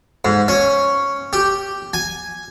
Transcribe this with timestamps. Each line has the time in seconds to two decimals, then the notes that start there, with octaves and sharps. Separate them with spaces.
0.25 G#2
0.48 C#4
1.33 G4
1.93 G#5